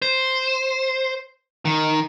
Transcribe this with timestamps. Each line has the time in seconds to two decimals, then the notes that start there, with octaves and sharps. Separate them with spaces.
0.02 C5
1.65 D#3